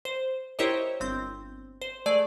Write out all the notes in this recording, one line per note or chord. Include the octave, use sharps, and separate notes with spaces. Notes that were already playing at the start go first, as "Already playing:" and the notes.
C5
E4 G4 A#4 C5 C#5 D#5
G1 C4 G6
C5
A3 G#4 D5